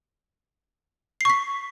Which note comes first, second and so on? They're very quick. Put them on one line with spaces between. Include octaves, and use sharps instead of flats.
C7 C#6 B6